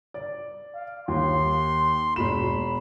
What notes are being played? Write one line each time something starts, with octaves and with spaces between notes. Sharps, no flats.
D5
F5
D#2 C6
E1 F#4 B5 E7